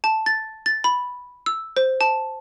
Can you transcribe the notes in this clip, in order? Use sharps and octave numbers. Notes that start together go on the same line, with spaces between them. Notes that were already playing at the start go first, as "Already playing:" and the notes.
A5
A6
A6
B5
E6
C5
A5